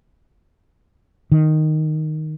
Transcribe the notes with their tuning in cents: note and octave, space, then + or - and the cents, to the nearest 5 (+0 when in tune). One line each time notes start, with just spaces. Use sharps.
D#3 -5